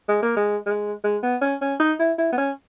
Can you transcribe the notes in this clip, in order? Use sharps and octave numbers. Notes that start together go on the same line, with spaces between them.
G#3
A#3
G#3
G#3
G#3
B3
C#4
C#4
D#4
E4
E4
B3
C#4